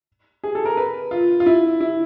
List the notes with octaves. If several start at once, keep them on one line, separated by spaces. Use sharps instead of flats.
G#4
A4
A#4
B4
F4
F4
E4
E4